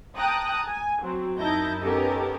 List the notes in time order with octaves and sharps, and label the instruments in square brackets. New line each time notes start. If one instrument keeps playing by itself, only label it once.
[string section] G5 A5 A#5 D#6 F#6
G#5
F#3 C4
F#2 D#4 E4 A5 G6 A#6
B3 C#4 G4 A4 A#4 D#5